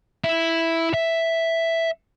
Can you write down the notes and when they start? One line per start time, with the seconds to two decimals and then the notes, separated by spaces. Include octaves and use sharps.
0.24 E4
0.94 E5